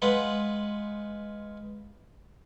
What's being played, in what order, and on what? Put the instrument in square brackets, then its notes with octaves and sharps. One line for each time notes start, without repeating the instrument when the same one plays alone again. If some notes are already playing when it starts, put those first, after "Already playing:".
[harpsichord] G#3 F4 B4 F#5